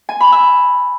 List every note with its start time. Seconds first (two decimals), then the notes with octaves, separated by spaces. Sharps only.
0.09 G#5
0.21 B5
0.32 E6